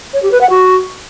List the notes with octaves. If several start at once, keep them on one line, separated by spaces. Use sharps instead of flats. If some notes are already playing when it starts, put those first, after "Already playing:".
C#5
G4
B4
F#5
F#4